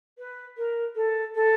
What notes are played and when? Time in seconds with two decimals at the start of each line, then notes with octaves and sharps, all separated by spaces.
0.18 B4
0.57 A#4
0.95 A4
1.34 A4